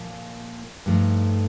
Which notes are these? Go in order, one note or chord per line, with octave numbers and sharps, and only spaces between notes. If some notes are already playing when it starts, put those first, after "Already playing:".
Already playing: A#2 F3 A#3
G2 F3 A3 D#4